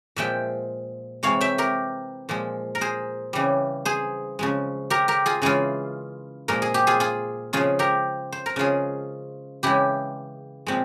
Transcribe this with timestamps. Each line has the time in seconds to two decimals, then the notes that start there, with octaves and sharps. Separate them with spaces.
0.16 A#2 F3 G#3 E5 G5
1.23 C3 E3 G#3 C#5 F5
1.41 E5 G5
1.58 G4 A#4
2.29 A#2 F3 G#3
2.75 A#4
2.81 G#4 C5
3.33 C#3 E3 G3
3.85 G#4 C5
4.39 C#3 F3 G#3
4.90 G4 A#4
5.08 G4 A#4
5.26 F4 G#4
5.42 C#3 E3 G#3 F4 G#4
6.48 A#2 F3 G#3 A#4
6.62 G#4
6.74 G4
6.87 F4 G#4
7.00 F4 G#4
7.53 C#3 F3 G#3 F4 G#4
7.79 G4 A#4
8.32 C5
8.46 A#4
8.56 C#3 F3 G#3 F4 G#4
9.63 C#3 E3 G#3 E4 G4
10.67 A#2 F3 G#3 C4